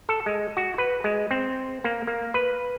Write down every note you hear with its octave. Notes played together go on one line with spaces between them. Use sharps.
A4
G#3
F#4
B4
G#3
C4
A#3
A#3
B4